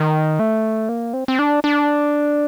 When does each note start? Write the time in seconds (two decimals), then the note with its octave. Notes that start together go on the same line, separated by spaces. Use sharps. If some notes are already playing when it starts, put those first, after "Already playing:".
Already playing: D#3
0.39 A3
0.89 A#3
1.13 C4
1.28 C4
1.39 D4
1.64 D4